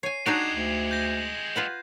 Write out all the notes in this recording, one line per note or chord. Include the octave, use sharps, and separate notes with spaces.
C#5 G#5 C7 D#7
G#3 D4 D#4 F#4 G4 G#6 C7 E7
D2
G6 A#6
F4 B4 F#5